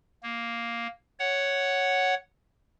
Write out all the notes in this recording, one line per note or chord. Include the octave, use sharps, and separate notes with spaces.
A#3
C#5 F#5